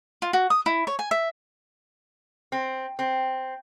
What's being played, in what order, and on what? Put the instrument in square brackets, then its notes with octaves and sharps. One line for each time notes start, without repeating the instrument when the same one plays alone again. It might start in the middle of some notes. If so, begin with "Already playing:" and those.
[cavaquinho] F4
F#4
D#6
E4
C#5
G#5
E5
[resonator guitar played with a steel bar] C4
C4